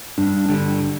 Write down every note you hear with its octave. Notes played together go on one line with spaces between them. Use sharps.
G2 D4
D3 G3